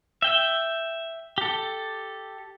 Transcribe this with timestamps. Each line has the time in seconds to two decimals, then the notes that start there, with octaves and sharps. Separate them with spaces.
0.22 E5 G5
1.38 G4 A4